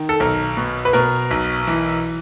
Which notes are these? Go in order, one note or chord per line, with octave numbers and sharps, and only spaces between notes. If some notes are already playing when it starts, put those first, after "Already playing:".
Already playing: D#3
A4
B1 A#4
B2
B4
B2 A#4
B1
E3